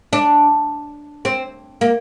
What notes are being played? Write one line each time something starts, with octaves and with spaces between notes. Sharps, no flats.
D4
C4
A#3